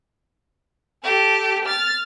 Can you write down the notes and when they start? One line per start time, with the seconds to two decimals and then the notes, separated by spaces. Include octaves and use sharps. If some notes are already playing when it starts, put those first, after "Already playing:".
1.04 G4 A4
1.65 F6 A6